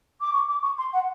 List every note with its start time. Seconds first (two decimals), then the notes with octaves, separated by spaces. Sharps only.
0.20 D6
0.33 C#6
0.48 D6
0.62 C#6
0.77 C6
0.92 F#5